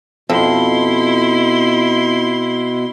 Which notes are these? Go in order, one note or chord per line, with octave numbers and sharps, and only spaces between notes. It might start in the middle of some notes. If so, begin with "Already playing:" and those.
F2 B2 E4 C6